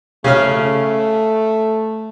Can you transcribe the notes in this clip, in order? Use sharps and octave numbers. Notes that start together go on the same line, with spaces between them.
C#3 A3 C#4 F6